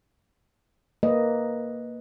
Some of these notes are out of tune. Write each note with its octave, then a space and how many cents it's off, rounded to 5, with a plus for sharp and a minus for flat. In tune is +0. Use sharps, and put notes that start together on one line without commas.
A#3 +0 B4 +0 D#5 +0